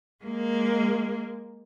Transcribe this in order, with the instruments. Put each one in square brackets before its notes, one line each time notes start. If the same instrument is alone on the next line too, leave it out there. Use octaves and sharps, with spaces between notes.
[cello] G#3 A#3